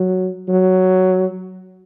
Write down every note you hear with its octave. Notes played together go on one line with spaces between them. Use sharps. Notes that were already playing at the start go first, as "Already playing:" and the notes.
Already playing: F#3
F#3